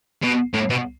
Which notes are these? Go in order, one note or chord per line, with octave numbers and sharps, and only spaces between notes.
B2
A2
B2